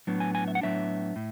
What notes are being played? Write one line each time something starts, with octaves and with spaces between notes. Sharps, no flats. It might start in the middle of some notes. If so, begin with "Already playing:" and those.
A2 F#3 B3 D4
G#5
G#5
E5
F#5
A2 F#3 B3 D4 E5
A2